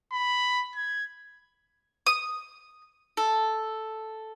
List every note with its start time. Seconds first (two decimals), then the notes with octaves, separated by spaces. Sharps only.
0.12 B5
0.76 G#6
2.06 D#6
3.17 A4